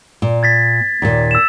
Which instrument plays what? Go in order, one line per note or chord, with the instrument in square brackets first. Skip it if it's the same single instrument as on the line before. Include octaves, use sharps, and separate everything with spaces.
[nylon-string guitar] A#2
[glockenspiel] G#6 A6 B6
[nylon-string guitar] D#2 A#2
[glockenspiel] E6 E7